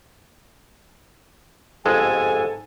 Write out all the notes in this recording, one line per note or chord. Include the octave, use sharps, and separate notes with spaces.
G1 F2 G#2 G#3 A4 G#5